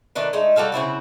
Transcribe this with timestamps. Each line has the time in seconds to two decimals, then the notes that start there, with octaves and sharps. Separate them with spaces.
0.15 D#3 A3 D4 B4
0.33 G#3 A3 D#4
0.56 G3 F#4 A4 F5
0.72 C#3 C4 E4 F#4